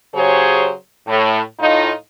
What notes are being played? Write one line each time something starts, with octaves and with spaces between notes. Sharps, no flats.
C#3 F#3 G4 G#4 C5 C#5
A2
A2 D#4 F4